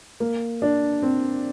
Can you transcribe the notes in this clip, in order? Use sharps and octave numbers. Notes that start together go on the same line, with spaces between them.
A#3
D4
C4